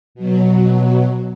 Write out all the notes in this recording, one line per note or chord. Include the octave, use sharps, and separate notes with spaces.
B2 F#3